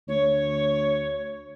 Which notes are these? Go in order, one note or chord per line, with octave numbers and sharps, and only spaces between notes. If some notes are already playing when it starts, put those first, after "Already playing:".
D2 C#5